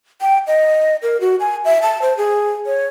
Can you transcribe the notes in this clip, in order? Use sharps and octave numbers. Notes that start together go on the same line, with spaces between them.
G5
D#5
A#4
F#4
G#5
E5
A5
C5
G#4
C#5